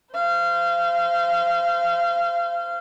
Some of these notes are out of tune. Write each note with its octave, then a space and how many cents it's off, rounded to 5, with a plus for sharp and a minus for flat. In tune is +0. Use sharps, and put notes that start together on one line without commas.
C5 -20 F5 -25